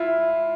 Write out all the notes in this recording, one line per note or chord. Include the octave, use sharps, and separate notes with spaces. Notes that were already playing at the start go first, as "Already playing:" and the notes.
Already playing: E4 F4